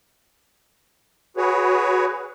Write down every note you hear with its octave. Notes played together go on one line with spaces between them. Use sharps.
F#4 G#4 B4 C#5